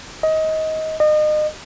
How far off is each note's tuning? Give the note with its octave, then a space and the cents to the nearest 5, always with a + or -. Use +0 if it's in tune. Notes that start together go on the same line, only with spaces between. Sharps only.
D#5 +20
D#5 -35